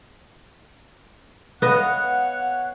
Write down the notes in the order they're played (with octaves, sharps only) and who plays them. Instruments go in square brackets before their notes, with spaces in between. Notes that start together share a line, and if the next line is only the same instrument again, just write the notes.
[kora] B3 D#5 [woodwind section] C#5 F5 F#5